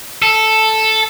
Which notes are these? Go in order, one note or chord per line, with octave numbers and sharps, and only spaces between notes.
A4